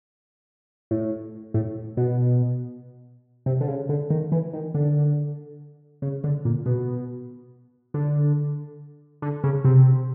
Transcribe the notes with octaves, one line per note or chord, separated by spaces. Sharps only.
A2
A2
B2
C3
D3
C#3
D3
D#3
E3
D#3
D3
C#3
D3
A#2
B2
D3
D3
C#3
C3